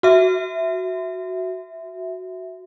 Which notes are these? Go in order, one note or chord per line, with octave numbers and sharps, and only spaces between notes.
F#4 E5